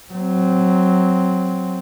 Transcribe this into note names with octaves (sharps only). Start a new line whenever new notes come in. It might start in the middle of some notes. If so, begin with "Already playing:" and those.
F#3 C4